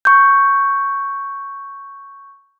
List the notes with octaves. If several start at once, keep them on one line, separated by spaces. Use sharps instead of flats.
C#6 G6